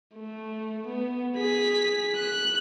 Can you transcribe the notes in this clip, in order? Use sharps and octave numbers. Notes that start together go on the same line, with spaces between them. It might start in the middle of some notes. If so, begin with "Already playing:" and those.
A3
B3
G#4 B6
F#6